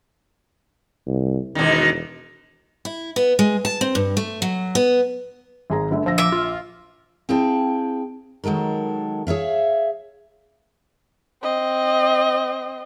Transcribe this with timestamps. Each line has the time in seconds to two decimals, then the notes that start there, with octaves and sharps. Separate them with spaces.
1.07 C2
1.55 E1 B2 D#3
2.85 E4
3.16 B3
3.39 G#3
3.65 A5
3.81 C4
3.95 G2
4.17 A3
4.42 F#3
4.75 B3
5.70 G#1 G#4 A#5
5.91 G1 D3 A3
6.06 A#1 F3 E6 A#6
6.18 E5 D6
6.32 F4
7.29 C4 E4 G#4 F5 G5 A5
8.44 D#3 F#3 G#3 A4 A#4
9.27 G#4 C#5 E5 F5
11.43 C4 D#5